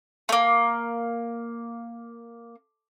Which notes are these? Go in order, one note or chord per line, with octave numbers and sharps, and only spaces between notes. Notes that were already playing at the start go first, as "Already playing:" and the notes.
A3 A#3